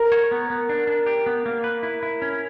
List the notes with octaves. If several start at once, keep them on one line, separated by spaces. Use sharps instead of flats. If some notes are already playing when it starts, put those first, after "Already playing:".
Already playing: A#4
C#5
B3
B3
D4
D4
G4
B3
A#3
B4
E4
E4
C#4